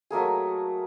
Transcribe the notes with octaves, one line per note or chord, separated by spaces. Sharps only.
F#3 A3 A#3 G#4